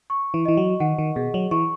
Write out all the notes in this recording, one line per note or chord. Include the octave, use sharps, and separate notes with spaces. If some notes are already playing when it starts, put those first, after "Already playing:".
C#6
E3
E3 D#5
F#3
D#3 F#5
D#3
B2 G#4
F#3
E3 C#6